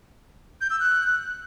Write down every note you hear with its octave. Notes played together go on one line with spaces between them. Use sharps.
G6
E6
F#6